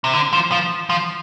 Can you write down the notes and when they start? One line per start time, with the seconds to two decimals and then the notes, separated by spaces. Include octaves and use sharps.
0.04 C3
0.14 D3
0.33 F3
0.52 F3
0.90 F3